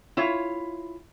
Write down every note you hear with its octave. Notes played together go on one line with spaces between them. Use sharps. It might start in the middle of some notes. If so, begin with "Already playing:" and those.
E4 F4 C#5